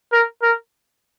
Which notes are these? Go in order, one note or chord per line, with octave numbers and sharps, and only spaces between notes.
A#4
A#4